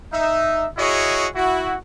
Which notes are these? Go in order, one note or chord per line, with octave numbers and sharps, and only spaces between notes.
D#4 E5
E4 F#4 G#4 C#5 D#5
E4 F#4